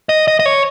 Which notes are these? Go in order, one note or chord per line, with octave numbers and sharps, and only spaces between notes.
D#5
D#5
D#5
C#5